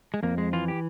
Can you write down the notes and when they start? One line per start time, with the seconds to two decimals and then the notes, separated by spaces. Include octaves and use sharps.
0.14 G#3
0.23 F2 A#3
0.38 G#3
0.53 E3 F4
0.68 G4